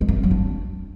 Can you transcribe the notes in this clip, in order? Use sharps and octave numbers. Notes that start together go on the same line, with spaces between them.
G#3
A#3
C#4
F#3
D4